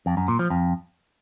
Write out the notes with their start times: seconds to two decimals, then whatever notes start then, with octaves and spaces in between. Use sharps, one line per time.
0.06 F2
0.17 F#2
0.28 A#2
0.39 F3
0.50 F2